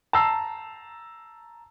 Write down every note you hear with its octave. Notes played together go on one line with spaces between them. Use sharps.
A5 A#5 E6 C7